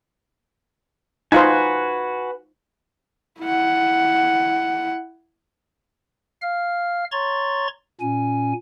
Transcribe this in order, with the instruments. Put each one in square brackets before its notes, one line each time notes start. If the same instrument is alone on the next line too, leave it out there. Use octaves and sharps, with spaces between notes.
[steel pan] D#4 F4 C5 [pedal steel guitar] F#4 B4 G#5
[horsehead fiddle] E4 F#5
[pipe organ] F5 F6
C#5 A#5 C6 C#6 A6
A#2 C#4 G#5